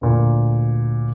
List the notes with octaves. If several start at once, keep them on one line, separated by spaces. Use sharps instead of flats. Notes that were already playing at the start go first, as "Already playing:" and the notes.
D2 A#2